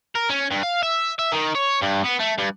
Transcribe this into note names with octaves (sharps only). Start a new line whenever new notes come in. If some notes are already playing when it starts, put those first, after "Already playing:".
A#4
C#4
G2
F5
E5
E5
D#3
C#5
G2
B3
A3
G2